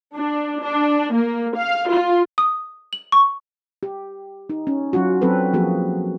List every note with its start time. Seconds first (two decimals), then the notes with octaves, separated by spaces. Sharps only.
0.16 D4
0.64 D4
1.15 A#3
1.57 F5
1.90 F4
2.38 D#6
2.93 F#7
3.12 C#6
3.83 G4
4.50 D#4
4.67 C#4
4.93 F#3 C#4 F4 F#4
5.22 F#3 C4 A4 B4
5.53 F3 F#3 A#3 F#4 G#4